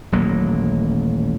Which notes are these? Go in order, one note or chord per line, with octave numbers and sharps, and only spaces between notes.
D#1 A1 F#3 A#3